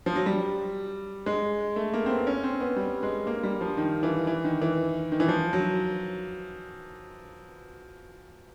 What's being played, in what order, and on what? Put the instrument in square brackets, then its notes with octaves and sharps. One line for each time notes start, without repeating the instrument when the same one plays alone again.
[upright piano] F3
F#3
G3
G#3
A3
A#3
C4
B3
C#4
C4
B3
G3
G#3
A#3
G3
F3
D#3
E3
E3
D#3
E3
D#3
E3
F3
F#3